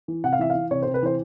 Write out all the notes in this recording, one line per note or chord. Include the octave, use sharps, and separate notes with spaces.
E3
C3 F#5
F5
E3 E5
E3 F5
C3 C#5
C5
C3
B4
E3 C5